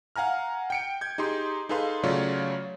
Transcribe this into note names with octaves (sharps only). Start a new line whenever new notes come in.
F5 F#5 G#5 A#5 F6
G5 C#7 D7
G6 G#6
D#4 G4 G#4 C6
D#4 G#4 A4 B4 F5 C6
C#3 F#3 A3 F4 C#5 D5